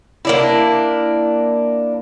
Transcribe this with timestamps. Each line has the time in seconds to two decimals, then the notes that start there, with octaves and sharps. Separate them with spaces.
0.25 A#3 D4 E4